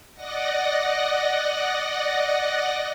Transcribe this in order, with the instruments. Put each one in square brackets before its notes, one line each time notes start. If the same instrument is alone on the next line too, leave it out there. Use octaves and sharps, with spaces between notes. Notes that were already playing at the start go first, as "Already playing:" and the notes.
[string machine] D5 D#5 F#5 A#6